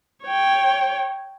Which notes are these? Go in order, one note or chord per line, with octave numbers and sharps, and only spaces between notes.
C#5 G5